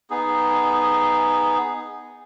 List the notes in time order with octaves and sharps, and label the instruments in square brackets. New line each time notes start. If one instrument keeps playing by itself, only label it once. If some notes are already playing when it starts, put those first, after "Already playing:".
[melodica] B3 D#4 G#4